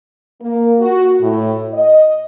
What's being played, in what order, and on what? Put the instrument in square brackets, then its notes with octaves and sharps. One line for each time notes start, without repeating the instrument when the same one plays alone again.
[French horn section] A#3
F#4
A2
D#5